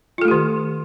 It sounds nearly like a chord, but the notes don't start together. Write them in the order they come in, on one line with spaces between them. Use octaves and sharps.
F4 A4 A3 G4 D#3